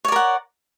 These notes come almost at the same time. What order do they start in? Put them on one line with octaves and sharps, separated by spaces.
C#5 D5 A#4 F#5